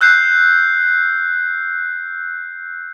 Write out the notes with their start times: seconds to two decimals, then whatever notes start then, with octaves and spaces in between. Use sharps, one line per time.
0.01 E6 F#6 G6 C7